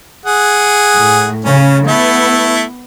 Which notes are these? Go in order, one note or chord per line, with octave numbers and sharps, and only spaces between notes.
G#4 F#5
A2
C#3 C#4
A3 B3 E4